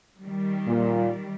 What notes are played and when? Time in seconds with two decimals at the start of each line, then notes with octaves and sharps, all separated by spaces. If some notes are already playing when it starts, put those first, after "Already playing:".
0.21 D#3 G3
0.68 A#2